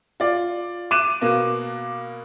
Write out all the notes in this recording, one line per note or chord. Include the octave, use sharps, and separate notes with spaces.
F4 D5
D6 F#6 D#7 E7
B2 A#3